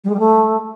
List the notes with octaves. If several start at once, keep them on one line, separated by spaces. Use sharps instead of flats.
G3
G#3
G3
A3